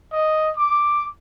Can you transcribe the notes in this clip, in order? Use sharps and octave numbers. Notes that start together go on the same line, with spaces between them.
D#5
D6